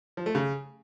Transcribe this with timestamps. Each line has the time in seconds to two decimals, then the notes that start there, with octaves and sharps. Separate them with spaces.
0.17 F3
0.26 A3
0.35 C#3